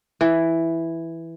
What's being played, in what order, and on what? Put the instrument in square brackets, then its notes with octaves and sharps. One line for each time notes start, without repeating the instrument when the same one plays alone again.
[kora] E3